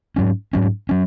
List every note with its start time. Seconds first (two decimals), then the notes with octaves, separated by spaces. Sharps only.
0.16 G#2 F#3 C#4
0.53 G#2 F#3 C#4
0.89 F#3 C#4